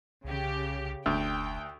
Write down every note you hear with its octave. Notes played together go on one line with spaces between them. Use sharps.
C2 C#3 G4
F1 D2 G5